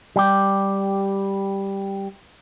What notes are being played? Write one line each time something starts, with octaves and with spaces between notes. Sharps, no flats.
G3 G4